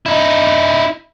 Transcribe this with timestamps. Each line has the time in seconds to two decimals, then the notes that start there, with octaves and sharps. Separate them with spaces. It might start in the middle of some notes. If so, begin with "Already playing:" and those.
0.06 D#4 E4